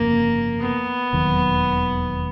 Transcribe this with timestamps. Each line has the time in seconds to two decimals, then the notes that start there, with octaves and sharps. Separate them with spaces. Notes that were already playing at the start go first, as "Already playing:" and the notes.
Already playing: G1 F2 C#3 A#3
0.61 B3
1.13 E1 D#2 D#3 F#3